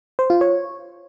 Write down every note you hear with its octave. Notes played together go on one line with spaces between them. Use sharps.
C5
F4
C#5